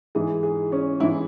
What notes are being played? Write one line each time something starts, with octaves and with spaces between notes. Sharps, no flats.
G#2 E3 G#4
G#4
C#4
G#2 E3 E4